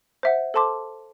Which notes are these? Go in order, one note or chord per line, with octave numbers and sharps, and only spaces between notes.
C5 E5 F#5
A4 C5 A5 C6 D6